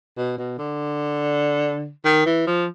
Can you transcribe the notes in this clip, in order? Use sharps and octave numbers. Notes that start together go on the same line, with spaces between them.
B2
B2
D3
D#3
E3
F3